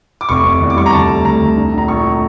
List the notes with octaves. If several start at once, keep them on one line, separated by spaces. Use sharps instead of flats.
D6
F1 C#6
F1
E2
D6
G3 C#6
A#5
D2 A5
A3
D2 A#5
D2
D4
A#1
A#5
A#1 C#6
A3